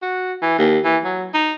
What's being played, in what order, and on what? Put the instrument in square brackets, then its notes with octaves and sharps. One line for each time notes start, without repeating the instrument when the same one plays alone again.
[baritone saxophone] F#4
E3
D#2
E3
F#3
D#4